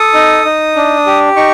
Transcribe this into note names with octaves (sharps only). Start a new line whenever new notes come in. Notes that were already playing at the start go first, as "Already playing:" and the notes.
Already playing: A4 D#6
D#4
D#4
D4
G4
D#4 C#6